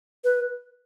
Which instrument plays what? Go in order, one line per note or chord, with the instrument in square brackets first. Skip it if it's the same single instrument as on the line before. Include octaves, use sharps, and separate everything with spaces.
[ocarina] B4